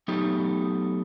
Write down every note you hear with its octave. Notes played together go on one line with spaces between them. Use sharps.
F#3 A3 B3 D#4 G4